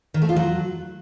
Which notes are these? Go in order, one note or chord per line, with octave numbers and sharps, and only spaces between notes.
D#3
A3
F4
F#3